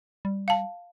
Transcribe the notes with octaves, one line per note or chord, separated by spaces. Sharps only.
G3
F5 A5